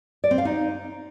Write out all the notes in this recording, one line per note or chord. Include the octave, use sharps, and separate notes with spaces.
D5
C4
F5
D#4